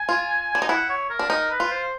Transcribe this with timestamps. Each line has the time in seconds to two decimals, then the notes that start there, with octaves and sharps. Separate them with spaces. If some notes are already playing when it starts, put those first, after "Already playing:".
Already playing: G#5
0.09 F4
0.55 D4
0.62 D#4
0.69 E4 F#5
0.89 C#5
1.10 A#4
1.19 D4
1.30 D#4 A#4
1.51 B4
1.60 F4
1.71 C5